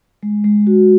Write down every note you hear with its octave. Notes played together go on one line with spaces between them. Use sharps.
G#3
G#3
F#4